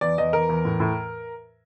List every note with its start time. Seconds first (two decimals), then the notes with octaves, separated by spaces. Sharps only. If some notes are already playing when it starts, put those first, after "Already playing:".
0.01 E2 D5
0.18 E2 D#5
0.33 E2 A#4
0.49 E2
0.65 A2
0.80 A2